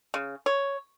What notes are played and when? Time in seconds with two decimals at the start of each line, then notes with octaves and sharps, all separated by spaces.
0.14 C#3
0.46 C#5